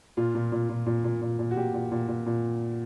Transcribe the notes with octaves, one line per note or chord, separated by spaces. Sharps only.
A#2 F4
A#2
A#2
A#2
A#2
A#2
A#2
A#2
F#4
A#2 G4
A#2
A#2
A#2
A#2